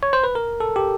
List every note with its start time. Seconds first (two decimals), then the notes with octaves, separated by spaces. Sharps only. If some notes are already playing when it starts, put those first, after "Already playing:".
0.03 C#5
0.13 C5
0.24 B4
0.35 A#4
0.60 A4
0.76 G4